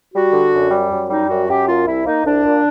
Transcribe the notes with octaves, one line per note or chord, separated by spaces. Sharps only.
G3 F#4
D3
F#2
G3
F#2
G3 D#4
F#2 F#4
F#2 G4
A#3 F4
C2 E4
A#3 D#4
C2 D4
A#2